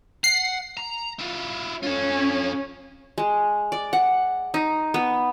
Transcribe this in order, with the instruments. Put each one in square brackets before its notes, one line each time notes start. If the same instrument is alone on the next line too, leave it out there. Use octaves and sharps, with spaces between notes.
[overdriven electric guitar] F#5 [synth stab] C7
[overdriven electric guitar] A#5
E4 F4
[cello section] C#4 [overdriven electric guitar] F4 A4
[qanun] G#3
D5
F#5
D#4
B3